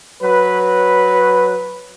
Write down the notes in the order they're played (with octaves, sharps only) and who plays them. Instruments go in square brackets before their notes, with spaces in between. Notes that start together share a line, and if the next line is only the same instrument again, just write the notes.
[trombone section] F#3 B4